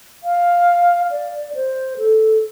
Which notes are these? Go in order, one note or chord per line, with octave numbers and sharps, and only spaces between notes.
F5
D5
C5
A4